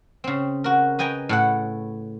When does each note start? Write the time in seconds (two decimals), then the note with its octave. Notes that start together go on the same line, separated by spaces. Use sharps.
0.24 C#3 C4
0.64 F#4 A#4
0.99 B4 D#5 G5 G#5 A#5
1.29 A2 A4 F#5